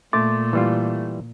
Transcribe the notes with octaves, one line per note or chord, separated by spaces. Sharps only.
A#2 A3 C6 D6 A6
E3 G3 F4